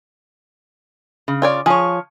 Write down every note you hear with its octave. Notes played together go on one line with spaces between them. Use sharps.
C#3
F4 C#5 D5
F3 G#4 C#5